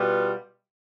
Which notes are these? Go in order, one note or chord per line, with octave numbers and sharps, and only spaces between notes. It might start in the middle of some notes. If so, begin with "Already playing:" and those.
Already playing: B2 G3 B3 F4